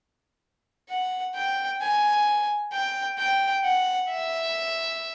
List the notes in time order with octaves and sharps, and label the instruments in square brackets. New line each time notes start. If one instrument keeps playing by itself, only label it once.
[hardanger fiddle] F#5
G5
G#5
G5
G5
F#5
E5